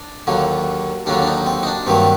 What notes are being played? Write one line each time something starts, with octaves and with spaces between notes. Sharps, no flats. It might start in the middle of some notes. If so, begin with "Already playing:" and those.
Already playing: D4
D#2 D3 F#3 A#3
D#2 D3 F#3 A#3 D4
D4
D#4
C4
D#4
D4
G2 D#3 F#3 A#3 C4